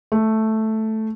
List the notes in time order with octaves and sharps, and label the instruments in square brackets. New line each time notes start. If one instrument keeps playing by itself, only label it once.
[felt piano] A3